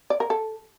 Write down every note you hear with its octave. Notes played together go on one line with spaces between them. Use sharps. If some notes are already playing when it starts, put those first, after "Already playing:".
D5
A#4
A4